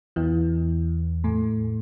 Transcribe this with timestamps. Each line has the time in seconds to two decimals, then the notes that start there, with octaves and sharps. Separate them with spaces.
0.16 E2 E3
1.24 A2 A3